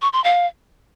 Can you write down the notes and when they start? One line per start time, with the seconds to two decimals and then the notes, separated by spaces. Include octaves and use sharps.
0.02 C#6
0.13 C6
0.24 F5